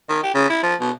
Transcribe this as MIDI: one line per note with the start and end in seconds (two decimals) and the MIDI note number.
0.09 0.19 51
0.23 0.31 67
0.34 0.46 49
0.49 0.62 64
0.63 0.74 53
0.80 0.91 47